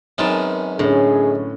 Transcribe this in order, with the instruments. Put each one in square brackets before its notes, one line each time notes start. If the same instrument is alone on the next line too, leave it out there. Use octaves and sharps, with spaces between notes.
[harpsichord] F#2 D#3 G#3 [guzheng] B3 C4 A5
[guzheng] A2 [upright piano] D3 C#4 [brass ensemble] G#4